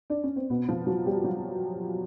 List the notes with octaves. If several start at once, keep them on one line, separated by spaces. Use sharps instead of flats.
D4
C#4
C4
B2 B3
F3 F4
F#3 F#4
G3 G4
F#3 F#4